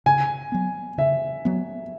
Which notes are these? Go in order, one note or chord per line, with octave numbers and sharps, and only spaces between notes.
C#3 G#5
F#3 B3
C#3 E5
F#3 B3